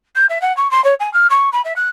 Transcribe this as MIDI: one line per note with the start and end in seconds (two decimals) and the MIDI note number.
0.15 0.26 91
0.29 0.41 76
0.41 0.55 78
0.57 0.70 85
0.71 0.83 84
0.84 0.94 73
1.00 1.12 80
1.13 1.27 89
1.30 1.49 85
1.52 1.61 83
1.64 1.73 76
1.76 1.89 90